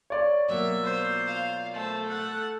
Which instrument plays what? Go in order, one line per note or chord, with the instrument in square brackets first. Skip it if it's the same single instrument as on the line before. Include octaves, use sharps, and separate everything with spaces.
[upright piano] C#5 D5
[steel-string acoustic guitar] B2 F#3 A#3 [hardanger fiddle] E5
[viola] F4 C5
[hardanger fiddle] F5
[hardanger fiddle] A3 [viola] C5 A5
[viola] A4 F#5